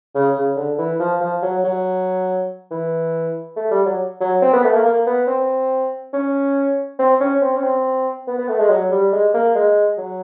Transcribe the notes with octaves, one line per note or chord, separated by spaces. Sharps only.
C#3
C#3
D3
E3
F3
F3
F#3
F#3
E3
A3
G3
F#3
F#3
C4
B3
A3
A#3
A#3
B3
C4
C#4
C4
C#4
C4
C#4
C4
B3
B3
A3
G#3
F#3
G3
G#3
A#3
G#3
F#3